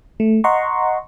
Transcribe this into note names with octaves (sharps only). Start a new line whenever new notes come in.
A3
D#5 F#5 A#5 C6 C#6